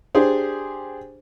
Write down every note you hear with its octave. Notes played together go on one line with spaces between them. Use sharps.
D4 G4 G#4 C5